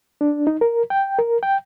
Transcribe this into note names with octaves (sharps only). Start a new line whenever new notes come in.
D4
D#4
A#4
G5
A#4
G5